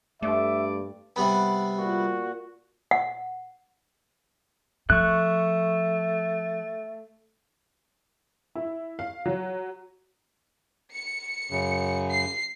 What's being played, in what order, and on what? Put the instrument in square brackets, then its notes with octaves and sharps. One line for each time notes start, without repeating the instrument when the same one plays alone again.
[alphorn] G2 [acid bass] A3 [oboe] D5 [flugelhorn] E5
[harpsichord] C3 G3 B3 [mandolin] F#5 B5
[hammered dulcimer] A#2 [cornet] F#4
[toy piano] F#5
[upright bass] F3 [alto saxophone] A3 [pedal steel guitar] C#6 F#6
[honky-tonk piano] E4
F5
F#3
[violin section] C#7
[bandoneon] F#2 C#3
[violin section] C7